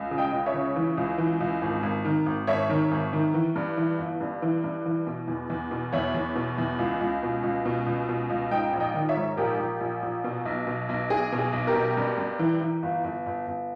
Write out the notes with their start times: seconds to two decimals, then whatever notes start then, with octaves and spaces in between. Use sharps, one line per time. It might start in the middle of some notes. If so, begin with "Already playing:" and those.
Already playing: C#2
0.11 C#3
0.18 D#5 G5
0.32 C#2
0.46 C#5 E5
0.54 C#3
0.76 E3
0.97 C#2
1.18 E3
1.40 C#2
1.62 G#1
1.83 G#1
2.05 D#3
2.26 G#1
2.47 G#1 C#5 E5
2.69 D#3
2.91 G#1
3.13 D#3
3.34 E3
3.56 G2
3.77 E3
3.99 G1
4.20 G2
4.42 E3
4.64 G2
4.85 E3
5.07 B2
5.28 E2
5.50 E2
5.71 B2
5.93 E2 C#5 E5
6.14 E2
6.36 B2
6.58 E2
6.79 C#2
7.01 C#2
7.23 B2
7.43 C#2
7.65 B2
7.86 C#2
8.09 B2
8.30 C#2
8.51 G#2 D#5 G5
8.73 A#1
8.80 D#5 G5
8.94 D#3
9.09 C#5 E5
9.17 G#2
9.37 A#1 G4 A#4
9.59 A#1
9.81 A#1
10.02 A#1
10.24 B2
10.45 B1
10.67 B2
10.89 B1
11.10 B1 G#4
11.32 B2
11.38 G#4
11.53 B1
11.67 G4 A#4
11.74 B2
11.97 G2
12.18 G2
12.39 E3
12.61 E3
12.83 G1
13.04 G1
13.26 G1
13.47 G1